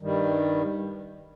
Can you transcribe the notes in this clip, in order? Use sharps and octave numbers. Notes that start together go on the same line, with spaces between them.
G2 D#3 G3